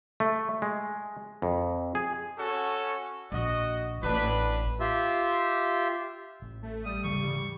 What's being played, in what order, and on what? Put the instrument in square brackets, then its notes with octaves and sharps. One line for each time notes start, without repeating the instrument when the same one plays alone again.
[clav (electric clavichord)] A3
G#3
F2
G#4
[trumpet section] C#4 F#4 A4
[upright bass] A#1 [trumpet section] F#4 D#5
[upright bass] A1 [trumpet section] D4 B4
[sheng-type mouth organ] F4 G4 E5
[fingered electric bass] A1
[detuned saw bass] A3
[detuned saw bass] G3 [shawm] D#6
[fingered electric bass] G#2 C#3 E3 [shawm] C#6